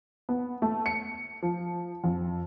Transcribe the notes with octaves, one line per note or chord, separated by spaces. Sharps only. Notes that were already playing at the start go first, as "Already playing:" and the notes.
B3
A3
C#7
F3
F2